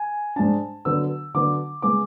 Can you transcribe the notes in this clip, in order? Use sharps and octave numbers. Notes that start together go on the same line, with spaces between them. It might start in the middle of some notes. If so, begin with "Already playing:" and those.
Already playing: G#5
G#2 G#3 D4 A5
D3 F#3 B3 E6
D3 F#3 B3 D6
C#3 G#3 B3 D6